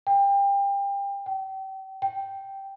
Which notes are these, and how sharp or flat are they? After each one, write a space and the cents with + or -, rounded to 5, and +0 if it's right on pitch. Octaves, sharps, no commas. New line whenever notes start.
G5 +30
G5 -35
G5 -5